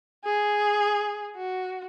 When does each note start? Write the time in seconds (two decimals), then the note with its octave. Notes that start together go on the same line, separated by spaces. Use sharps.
0.25 G#4
1.36 F#4